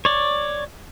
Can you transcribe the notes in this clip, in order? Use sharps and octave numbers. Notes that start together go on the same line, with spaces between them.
C#5 D5